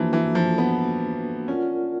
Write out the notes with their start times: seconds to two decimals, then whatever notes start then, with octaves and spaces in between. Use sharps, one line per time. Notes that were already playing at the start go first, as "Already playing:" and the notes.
Already playing: E3 F3 A#3 D4 F#4
0.13 E3
0.35 F3
0.58 B3
1.48 C#4 F4 A#4 D5 F#5